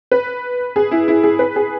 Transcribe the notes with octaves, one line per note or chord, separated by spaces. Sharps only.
B4
G#4
E4
E4
G#4
B4
G#4